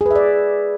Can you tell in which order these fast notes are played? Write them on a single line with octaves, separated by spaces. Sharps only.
G#4 B4 E5 D5